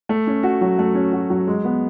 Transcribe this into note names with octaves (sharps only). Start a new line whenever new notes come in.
A3
C#4
F#4
F#3
A3
C#4
F#4
F#3
G#3
B3